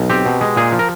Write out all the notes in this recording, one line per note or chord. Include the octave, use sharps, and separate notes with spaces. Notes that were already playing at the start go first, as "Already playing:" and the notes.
Already playing: B1
C4 G4
B2
G#3
A#2 G#4
F3
A#4